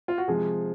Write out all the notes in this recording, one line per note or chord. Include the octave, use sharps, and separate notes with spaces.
F4
F#4
C3 F3 G#3 G#4